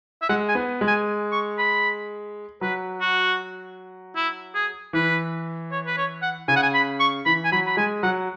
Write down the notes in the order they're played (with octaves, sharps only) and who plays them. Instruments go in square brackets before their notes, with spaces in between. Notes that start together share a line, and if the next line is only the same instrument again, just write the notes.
[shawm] E5
[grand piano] G#3 [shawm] F#5
[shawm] G#5
[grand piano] B3
G#3
[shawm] G#5
C#6
B5
[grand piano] F#3 [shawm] B4
[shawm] F#4
E4
G#4
[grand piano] E3 [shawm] B4
[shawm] C#5
B4
C#5
F#5
[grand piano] C#3 [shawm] G#5
[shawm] F#5
G#5
B5
C#6
[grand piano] E3 [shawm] B5
[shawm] G#5
[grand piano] F#3 [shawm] B5
[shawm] B5
[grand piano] G#3 [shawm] G#5
[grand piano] F#3 [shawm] F#5